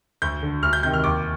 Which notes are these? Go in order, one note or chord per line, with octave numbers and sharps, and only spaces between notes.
D2 G6
D3
D2 F6
G6
C3 D#3 G6
F6
D#2 D6